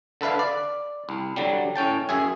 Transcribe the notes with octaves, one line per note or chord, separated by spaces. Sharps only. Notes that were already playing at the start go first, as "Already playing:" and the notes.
D3 A4 B4 E5 F5
D5
C2
D3 F#3 G3
A2 C#4 G5 A5
F#2 G#4 E5 G#5